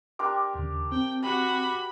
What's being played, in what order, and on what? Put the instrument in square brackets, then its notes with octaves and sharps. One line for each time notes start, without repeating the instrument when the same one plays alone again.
[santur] D4 G4 A#4 [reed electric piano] G5 C6 D6
[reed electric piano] D#2 C#3
[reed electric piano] C4 [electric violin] G5
[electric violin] F#4 [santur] G4 [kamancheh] B5